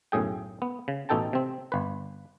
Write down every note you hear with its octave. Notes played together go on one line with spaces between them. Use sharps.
B1 F#2 A2 G#4 G5
B3
C#3
A1 B2 D#4 A4 G5 A5
C3 C4
G1 B4